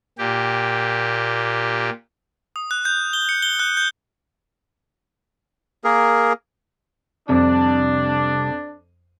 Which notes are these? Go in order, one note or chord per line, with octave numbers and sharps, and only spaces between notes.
A#2 G4
D#6
F#6
G6
G7
C#7
G7
F#6
G6
A#3 G#4 A#4
C2 F2 C3 D4